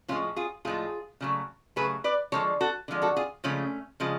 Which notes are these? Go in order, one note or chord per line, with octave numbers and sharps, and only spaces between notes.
A2 F3 G#3 C#4 F4
F4 G#4
A2 F3 G#3 F4 G#4
C#3 F#3 A3
C#3 F#3 A3 G#4 B4
B4 D5
D3 F3 G#3 A4 C#5
F#4 A4
D3 F3 G#3
F#4 A4
F4 G#4
C#3 F3 G#3 A3 C#4
C#3 F3 G#3